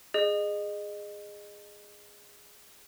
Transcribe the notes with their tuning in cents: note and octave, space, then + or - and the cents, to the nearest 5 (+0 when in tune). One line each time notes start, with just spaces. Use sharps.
G#4 -5 D#5 -25